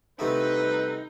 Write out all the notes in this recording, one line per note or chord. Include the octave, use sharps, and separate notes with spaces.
C2 C3 A3 B3 D#4 B4